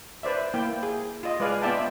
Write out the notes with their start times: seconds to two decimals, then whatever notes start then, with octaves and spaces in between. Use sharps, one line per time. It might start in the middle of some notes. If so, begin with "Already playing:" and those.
0.23 B4 C5 D5 E5
0.54 A#3 E4 G5
0.83 G#4
1.23 F4 D#5
1.40 G#3 B4 D5 F5 G#5
1.62 B3 F4 D5 E5 G5 A5